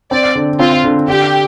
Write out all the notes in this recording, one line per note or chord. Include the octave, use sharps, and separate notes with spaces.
C4 D5
D3
C4 F4
D3
D3 G4